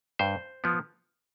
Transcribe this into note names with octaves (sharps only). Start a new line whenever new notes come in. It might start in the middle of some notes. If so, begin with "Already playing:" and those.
G2 C5
F3 B3